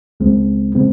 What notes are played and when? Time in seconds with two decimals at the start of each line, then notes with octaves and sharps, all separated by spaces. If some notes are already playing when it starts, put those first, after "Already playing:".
0.20 C#2 C#3 G#3 C4
0.75 C#3 G#3 C4